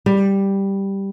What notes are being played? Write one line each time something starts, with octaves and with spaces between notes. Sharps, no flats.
G3